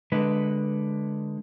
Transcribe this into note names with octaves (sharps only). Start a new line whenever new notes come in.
D3 G#3 B4